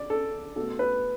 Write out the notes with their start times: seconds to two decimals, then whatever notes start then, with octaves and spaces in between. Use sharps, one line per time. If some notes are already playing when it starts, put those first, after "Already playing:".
Already playing: D5
0.10 A4
0.56 B2 A3 A4
0.79 B4